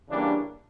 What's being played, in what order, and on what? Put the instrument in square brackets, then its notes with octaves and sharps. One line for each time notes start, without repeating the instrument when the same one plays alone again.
[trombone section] C#3 E3 G3 A#3 D4